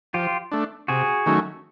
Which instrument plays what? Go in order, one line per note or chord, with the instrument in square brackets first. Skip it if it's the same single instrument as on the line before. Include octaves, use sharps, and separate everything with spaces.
[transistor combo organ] F3 [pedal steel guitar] F4 G4
[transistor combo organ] A3 D4
[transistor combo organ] C3 [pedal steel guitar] F#4 G#4
[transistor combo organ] D#3 F#3 A3 C#4